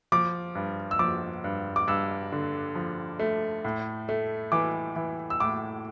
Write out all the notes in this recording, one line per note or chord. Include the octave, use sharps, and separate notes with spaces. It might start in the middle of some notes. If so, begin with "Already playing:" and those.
F3 D6
G2
E6
F3 D6
G2
D6
G2 E6
D3
F3
A3
A2
A3
E3 D6
E3
E6
A2 D6